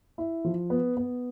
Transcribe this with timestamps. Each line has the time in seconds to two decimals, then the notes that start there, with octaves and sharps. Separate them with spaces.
0.18 E4
0.45 F3
0.70 B3
0.97 B3